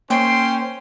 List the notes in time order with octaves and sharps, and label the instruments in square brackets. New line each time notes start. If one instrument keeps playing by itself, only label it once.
[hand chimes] A#3 C7 [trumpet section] C#4 C5 C6 [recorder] G5